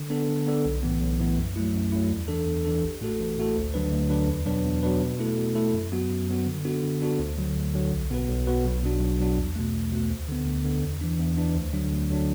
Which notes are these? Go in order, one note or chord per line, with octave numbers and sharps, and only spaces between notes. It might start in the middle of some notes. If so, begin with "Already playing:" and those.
Already playing: D3
B3 D4 A4
D3
B3 D4 A4
B1
A2 E3 B3
B1
A2 E3 B3
F#2
F#3 A3 E4
F#2
F#3 A3 E4
E2
E3 D4 A4
E2
E3 D4 A4
A1
A2 A3 F#4 A4
A1
A2 A3 F#4 A4
D2
D3 F#3 D4 B4
D2
D3 F#3 D4 B4
E2
B2 F#3 D4 B4
E2
B2 F#3 D4 B4
B2
A3 E4 A4
B2
A3 E4 A4
F#2
F#3 B3 F#4
F#2
F#3 B3 F#4
D3
B3 D4 F#4 A4
D3
B3 D4 F#4 A4
D2
D3 F#3
D2
D3 F#3
B1
B2 B3 F#4 B4
B1
B2 B3 F#4 B4
B1
B2 F#3 D4 F#4
B1
B2 F#3 D4 F#4
E2
B2 A3
E2
B2 A3
D2
D3 B3
D2
D3 B3
E2
E3 D4
E2
E3 D4
D2
D3 F#3 D4
D2
D3 F#3 D4